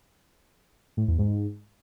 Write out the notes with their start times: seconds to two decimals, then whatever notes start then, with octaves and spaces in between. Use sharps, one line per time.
0.97 A2
1.08 E2
1.19 G#2